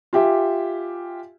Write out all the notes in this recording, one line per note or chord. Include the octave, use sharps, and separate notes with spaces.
F4 G4 E5 G#5